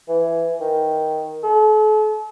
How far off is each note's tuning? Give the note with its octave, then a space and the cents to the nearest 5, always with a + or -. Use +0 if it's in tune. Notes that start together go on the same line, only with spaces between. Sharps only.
E3 +10
D#3 +5
A4 -40